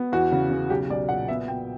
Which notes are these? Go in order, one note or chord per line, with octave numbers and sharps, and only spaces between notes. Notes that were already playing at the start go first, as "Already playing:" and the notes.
Already playing: B3
E2 F#4
C#3
C#3
B1 G4
B1 D5
A#2 F#5
B3 E5
B3 G5